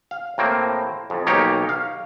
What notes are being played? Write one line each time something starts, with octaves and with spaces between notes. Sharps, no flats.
F5
A2 A#3 C4
F2
B1 A#3 D#4 G4 C#5
F5